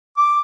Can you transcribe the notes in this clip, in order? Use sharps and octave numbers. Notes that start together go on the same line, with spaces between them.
D6